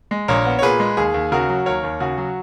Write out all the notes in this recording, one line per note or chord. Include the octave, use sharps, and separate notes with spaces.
G#3
A#1 A#4 C#5
B3
C#5
A#2 G#4 B4
G#3
D#2 G#4
D#2
C#3 F#4 A#4
F#3
D#2 A#4 C#5
D#2
C#3 F#4
F#3